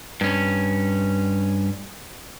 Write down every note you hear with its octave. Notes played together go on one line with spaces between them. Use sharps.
G2 C#4